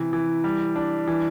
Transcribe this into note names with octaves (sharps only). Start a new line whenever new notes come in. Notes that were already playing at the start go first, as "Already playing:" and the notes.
Already playing: C3 E3
E3
G3
D4
E3